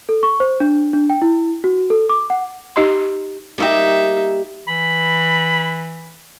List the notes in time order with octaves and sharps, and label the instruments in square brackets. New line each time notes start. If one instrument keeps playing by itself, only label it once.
[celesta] A4
C#6
C5
D4
D4
G5
E4
F#4
A4
D6
F#5
[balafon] D#4 G4 D#5 A#5 C6
[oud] G3 A#3 G4 [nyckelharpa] D#4 E5
[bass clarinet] E3 [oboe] B5